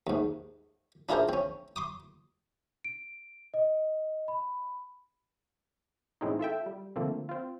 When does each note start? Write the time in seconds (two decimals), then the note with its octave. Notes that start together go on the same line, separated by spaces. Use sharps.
0.07 D#2 G#2
1.09 D4 E4 F4 G#4 A#4 C5
1.29 C4 C#4
1.76 C6 D6 D#6
2.84 D7
3.54 D#5
4.28 B5
6.21 A2 E3 G#3 C4 C#4 D#4
6.39 F4 A4 E5 G5
6.66 G3
6.96 D3 F3 A3 A#3 C4
7.29 C4 F4